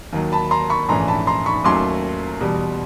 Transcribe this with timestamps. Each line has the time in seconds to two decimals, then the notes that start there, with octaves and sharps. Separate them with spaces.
0.13 D#2 D#3 F#3
0.32 A5 B5
0.51 A#5 C6
0.70 B5 C#6
0.89 A#1 G#2 E3 A3 C#4 A#5 C6
1.08 A5 B5
1.27 A#5 C6
1.46 B5 C#6
1.64 D#2 D#3 F#3 A3 C#4 C6 D6
2.40 E2 B2 G3